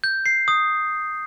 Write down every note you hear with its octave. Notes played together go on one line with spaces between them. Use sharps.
G6
C7
D#6